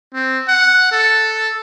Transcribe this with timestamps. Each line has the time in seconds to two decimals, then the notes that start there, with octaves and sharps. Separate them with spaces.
0.14 C4
0.48 F#5
0.92 A4